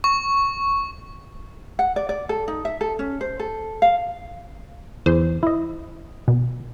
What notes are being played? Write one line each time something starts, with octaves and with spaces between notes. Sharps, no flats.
C#6
F#5
D5
D5
A4
D#4
E5
A4
C#4
C5
A4
F5
E2 C5
E4 D#5
B2